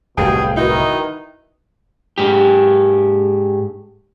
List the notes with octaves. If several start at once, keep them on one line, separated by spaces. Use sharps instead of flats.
D1 C2 B2 A3 G4 G#4 F5 G5
D#3 D#4 E4 F#4 B4
G#2 G4